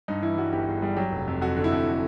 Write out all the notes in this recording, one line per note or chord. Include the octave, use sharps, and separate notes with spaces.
G2 D#4
E3 E4
G3 F#4
G1 G4
G1 G#4
G3 G#4
F#3 G4
F1
F2
F2 F#4
D3
E4
F2